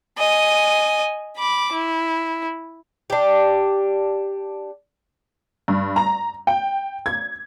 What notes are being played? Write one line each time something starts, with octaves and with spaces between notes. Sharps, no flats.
D#5 G#5
B5 D6
E4
D4 G4
G2
A#5
G5
G#6